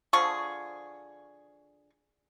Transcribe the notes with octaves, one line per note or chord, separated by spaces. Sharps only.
D3 F3 G#4 C#6